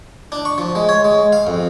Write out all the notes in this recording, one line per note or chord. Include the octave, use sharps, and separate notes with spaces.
D4
C#6
F3
G#3
C#5
G#3
F5
F2